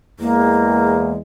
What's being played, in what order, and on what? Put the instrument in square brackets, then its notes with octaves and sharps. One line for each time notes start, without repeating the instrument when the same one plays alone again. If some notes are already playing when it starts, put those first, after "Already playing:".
[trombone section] E2 G#3 [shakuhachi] A#3